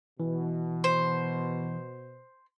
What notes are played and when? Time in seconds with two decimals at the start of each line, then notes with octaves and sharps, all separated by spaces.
0.20 B2 E3
0.84 C5